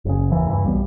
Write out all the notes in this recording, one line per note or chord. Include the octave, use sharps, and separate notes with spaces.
F#1 C#3
D#2 E3
E2 G2 C#3 E3
B1 G3 B3